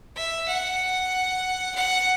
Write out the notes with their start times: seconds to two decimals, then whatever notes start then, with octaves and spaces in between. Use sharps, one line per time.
0.16 E5
0.48 F#5
1.75 F#5